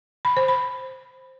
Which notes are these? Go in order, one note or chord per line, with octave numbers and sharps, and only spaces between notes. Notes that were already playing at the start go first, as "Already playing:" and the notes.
B5
C5
B5